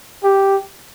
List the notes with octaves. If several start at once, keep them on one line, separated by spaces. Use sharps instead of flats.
G4